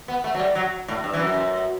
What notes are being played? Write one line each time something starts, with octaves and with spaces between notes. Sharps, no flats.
B3
A3
F#3
G3
F#3
A2
G2
E3
F#2